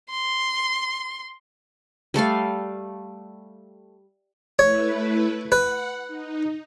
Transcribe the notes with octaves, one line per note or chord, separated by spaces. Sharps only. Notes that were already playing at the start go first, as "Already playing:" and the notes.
C6
G3 A3 A4 F5
A3 E4 B4 C#5
B4 F#5
D#4